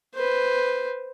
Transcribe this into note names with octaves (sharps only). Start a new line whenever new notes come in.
B4 C5